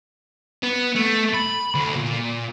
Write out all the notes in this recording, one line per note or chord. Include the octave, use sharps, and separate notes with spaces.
B3
A3
B5
D2
A#2